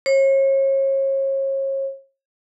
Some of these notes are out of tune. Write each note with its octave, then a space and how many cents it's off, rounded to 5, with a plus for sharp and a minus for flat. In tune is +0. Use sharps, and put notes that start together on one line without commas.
C#5 -35